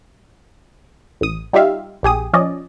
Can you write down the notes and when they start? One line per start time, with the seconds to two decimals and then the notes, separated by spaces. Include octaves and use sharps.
1.21 A1 D#6
1.53 G3 D#4 F4 G4 E5 F5
2.03 A#1 G4 G#4 D#6
2.33 F3 C#4 D5 D#5